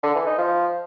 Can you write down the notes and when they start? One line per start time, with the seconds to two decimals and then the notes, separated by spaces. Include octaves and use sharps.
0.03 D3
0.15 E3
0.26 D#4
0.38 F3